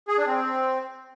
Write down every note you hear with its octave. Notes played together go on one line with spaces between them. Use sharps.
G#4
D4
C4